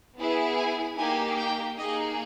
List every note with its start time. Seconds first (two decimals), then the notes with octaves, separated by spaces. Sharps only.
0.18 B3 E4 G#4
0.58 G#5
0.97 A#3 D#4 G4 G#5
1.38 G5
1.78 A#3 D#4 G#4 D#5